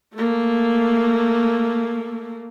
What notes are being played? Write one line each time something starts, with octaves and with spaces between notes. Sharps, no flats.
A3 A#3